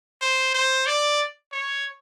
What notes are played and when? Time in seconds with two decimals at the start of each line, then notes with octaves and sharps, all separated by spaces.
0.21 C5
0.54 C5
0.86 D5
1.52 C#5